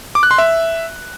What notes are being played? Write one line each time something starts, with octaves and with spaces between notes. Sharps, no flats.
D6
F#6
C6
E5